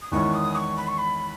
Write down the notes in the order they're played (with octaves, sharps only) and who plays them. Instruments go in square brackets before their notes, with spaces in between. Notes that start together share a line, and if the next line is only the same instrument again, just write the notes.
[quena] D#6
[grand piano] E2 D#3 G#3 C#4 E4 [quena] C#6
[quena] D#6
C#6
B5
C#6
B5